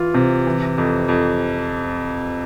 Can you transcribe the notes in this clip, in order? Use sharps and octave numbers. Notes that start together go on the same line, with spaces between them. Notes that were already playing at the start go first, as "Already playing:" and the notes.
Already playing: E3 F4
C3
E3
F2
F2